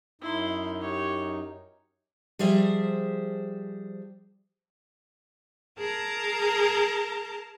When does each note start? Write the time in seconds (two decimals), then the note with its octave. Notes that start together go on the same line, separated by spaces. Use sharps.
0.21 F#2 D#4 E4 C6
0.81 G4 C#5
2.39 F3 G3 G#4 C5 E5
5.78 G#4 A#4 A5 A#5